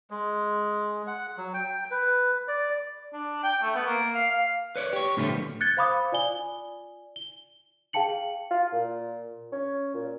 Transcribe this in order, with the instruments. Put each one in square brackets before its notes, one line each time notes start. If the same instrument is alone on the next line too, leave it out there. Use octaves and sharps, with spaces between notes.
[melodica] G#3
F#5
F#3
G5
B4
D5
[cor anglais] D4
G5
A3
B3
A#3
F5
F5
[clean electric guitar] B4 C#5 D5
G4 C#5
A2 D3 F3 G3 A3 B3
[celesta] F#6 G#6 A6 C#7 G7
C5 F5 B5 D6 D#6
F4 D5 G#5 G7
G7
G#4 F5 G5 A5 C#7 F#7
[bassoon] F4
A#2
C#4
A#2